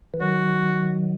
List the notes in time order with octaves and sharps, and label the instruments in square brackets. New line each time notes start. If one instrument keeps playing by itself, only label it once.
[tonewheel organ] E3
[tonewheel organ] D#3 F#3 [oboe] F#4